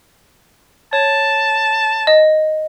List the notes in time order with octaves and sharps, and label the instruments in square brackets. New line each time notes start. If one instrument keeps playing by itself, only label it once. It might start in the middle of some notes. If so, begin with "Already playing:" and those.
[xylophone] C#5 [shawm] A5
[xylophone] D#5